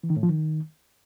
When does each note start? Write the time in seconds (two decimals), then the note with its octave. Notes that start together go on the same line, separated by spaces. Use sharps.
0.03 E3
0.10 D#3
0.16 A2
0.23 F3
0.29 D#3